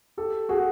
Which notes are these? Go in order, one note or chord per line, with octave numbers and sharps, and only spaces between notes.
G4 A4
F#4 G#4